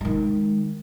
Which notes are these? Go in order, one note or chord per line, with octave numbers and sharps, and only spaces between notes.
D#3 G#3